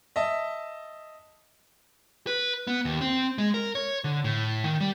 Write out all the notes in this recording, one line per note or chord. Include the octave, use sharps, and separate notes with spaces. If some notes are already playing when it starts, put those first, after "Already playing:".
D#5 E5 A5
B4
B3
D#2
C4
G#3
A#4
C#5
D3
A2
D#3
G3